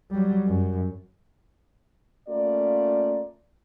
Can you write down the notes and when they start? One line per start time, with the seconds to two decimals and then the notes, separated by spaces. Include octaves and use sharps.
0.11 F#3 G3
0.47 F#2
2.29 A3 A#3 C#4 F4 D5